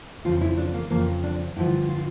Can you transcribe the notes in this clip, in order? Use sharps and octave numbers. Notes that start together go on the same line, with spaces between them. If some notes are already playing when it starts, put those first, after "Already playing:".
F2 C#3 F3 F4
E4
D4
A#3
F2 C#3 F3 A#3
D4
G2 D3 F3 E4
F4